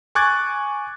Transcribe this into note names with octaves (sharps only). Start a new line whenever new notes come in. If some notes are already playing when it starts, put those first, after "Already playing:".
G#5 C#6 D6 F#6 G#6 A6